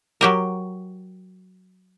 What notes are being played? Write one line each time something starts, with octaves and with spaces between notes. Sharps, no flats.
F#3 G4 A#4